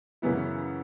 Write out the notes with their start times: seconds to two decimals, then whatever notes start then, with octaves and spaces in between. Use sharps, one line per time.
0.22 F#2 C#3 E3 B3 E4